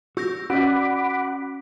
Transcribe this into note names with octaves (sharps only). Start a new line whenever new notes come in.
F#4 E6 G6 A#6
C#4 F#4 D5 D#5 F#5 B5 D6